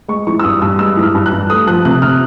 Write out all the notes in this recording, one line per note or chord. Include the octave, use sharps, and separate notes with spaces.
G#3 C#6
E3 C#6
E6
G2 D#6
G2 E6
G#3 E6
E3
F6
G2
F#6
G2
A3 D#6
F3 F#6
C3 F#6
C3 F6